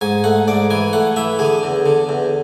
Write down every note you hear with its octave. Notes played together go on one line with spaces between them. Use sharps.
G#2 G#5
A3 F#5
G#2 D5
E3 G#5
A3 F#5
E3 E5
D3 G#4
E2
D3
E2